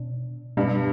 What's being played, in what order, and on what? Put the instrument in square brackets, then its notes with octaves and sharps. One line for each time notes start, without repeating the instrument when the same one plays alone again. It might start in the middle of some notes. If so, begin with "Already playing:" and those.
Already playing: [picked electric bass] B2 D4
[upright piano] G2 [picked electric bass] B2 G3 B3